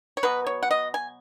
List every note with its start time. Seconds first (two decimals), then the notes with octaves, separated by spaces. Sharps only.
0.17 C#5
0.23 B2 F#3 B3 B4
0.47 C#5
0.63 F#5
0.71 D#5
0.94 G#5